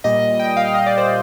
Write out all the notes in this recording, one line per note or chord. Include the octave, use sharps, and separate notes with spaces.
A#2 G3 D#5
G5
F5
D#5
D5
C5